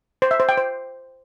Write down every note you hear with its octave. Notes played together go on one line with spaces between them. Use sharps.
C5
E5
C5
G5
C5